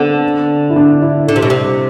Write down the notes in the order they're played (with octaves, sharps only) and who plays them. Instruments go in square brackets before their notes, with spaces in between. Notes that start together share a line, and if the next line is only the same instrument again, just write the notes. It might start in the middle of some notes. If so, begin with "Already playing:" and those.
Already playing: [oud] D3 [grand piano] B3 C4 D4
[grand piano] E4
D4
E4
[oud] D3
C3
B2
C3